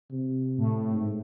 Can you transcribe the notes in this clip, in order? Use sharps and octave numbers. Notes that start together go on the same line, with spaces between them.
C3
A2
G#2